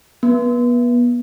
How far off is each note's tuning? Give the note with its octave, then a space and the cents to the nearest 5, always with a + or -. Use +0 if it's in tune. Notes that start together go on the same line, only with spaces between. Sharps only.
B3 -30